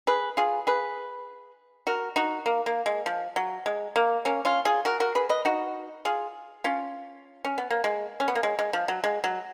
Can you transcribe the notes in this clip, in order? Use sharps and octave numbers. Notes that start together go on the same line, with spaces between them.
G#4 B4
F4 G#4
G#4 B4
F#4 A#4
D#4 F#4
A#3
A#3
G#3
F3
F#3
G#3
A#3
A#3 C#4
C#4 F4
F4 G#4
F#4 A#4
F#4 A#4
G#4 B4
B4 D#5
D#4 F#4
F4 G#4
C#4 F4
C#4
B3
A#3
G#3
C#4
B3
A#3
G#3
G#3
F3
F#3
G#3
F#3